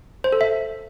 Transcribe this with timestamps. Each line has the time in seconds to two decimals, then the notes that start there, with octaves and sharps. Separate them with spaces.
0.24 C5
0.32 A4
0.41 E5